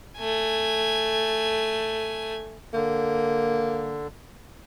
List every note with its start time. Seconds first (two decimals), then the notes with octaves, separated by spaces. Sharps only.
0.18 A3 G#5
2.74 D3 A#3